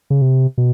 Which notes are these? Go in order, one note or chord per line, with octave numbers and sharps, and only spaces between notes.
C#3
C3
B2